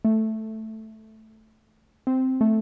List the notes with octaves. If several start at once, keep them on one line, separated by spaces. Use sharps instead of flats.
A3
C4
A3